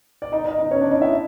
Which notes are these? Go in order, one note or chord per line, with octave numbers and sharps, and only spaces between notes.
D5
D#4 D#5
D#4 D#5
D#4 D#5
C#4 C#5
D4 D5
D#4 D#5
E4 E5